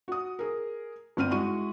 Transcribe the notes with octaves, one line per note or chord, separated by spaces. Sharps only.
F#4 D#6
G#4 A#4
G1 C4 F6 D#7
G#3 E4 F#4 C#6 D#7